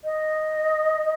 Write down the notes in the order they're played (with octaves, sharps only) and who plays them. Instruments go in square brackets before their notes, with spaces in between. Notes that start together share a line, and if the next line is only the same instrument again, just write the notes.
[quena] D#5